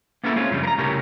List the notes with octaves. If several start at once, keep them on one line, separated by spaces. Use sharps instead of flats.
A#3 B3 C#4 E4 A4
G#3 C4 C#4 F4
F#2 C#3 F3 G3
A#4 A#5
C2 A2 C#3 C#4 G4 A#4